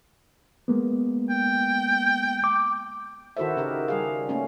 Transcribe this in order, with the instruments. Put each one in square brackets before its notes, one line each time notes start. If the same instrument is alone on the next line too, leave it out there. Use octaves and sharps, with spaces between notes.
[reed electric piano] G#3 A#3 B3
[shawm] G5
[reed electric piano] D6
[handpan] D#3 E4 F#4 A4 C5 E5
C#3 D#4 G4 A#4
G3 G#4 F5
A3 A#3 C#4